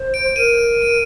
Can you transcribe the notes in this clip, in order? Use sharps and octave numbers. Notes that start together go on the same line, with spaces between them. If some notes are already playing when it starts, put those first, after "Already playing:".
Already playing: C5
D7
A#4 D#7
D7